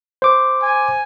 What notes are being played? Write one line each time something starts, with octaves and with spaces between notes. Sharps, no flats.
C5 D6
G#5